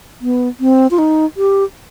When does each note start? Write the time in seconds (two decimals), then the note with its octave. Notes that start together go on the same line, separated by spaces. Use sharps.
0.21 B3
0.60 C4
0.91 F4
0.98 D#4
1.37 G4